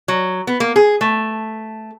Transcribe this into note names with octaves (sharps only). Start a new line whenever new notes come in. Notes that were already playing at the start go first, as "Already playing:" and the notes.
F#3
B3
A#3
G#4
A3